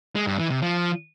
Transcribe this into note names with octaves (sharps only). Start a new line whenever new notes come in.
G#3
G2
E3
C3
F3